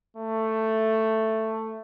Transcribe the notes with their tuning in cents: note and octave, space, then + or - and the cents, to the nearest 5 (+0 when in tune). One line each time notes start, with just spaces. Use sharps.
A3 +10